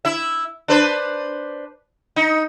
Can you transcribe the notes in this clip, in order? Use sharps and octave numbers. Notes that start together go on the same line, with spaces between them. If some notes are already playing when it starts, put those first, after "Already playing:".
E4 E5
D4 B4 C5
D#4